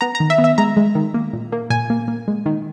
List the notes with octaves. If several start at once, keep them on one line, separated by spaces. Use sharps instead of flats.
B3 A#5
A#5
D#3
E5
B3
E5
G#3 A#5
G#3
D#3
A#3
A#2
A#3
A#2 G#5
A#3
A#3
G#3
D#3